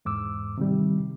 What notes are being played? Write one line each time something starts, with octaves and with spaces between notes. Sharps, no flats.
E2 G#2 D6 E6
C3 D#3 G3